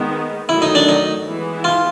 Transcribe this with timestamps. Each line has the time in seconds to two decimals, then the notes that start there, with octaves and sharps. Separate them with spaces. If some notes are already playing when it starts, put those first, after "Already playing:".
Already playing: D#3 G#3 B3
0.49 D#3 F#3 A3 E4
0.62 D#4
0.75 D4
0.89 D#4
1.26 E3 G#3 B3 E4
1.64 F4